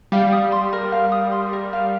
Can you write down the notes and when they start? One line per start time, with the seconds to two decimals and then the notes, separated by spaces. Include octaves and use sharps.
0.12 G3 F5
0.32 D#6
0.52 C6
0.73 A#4
0.92 F5
1.12 D#6
1.32 C6
1.53 A#4
1.73 F5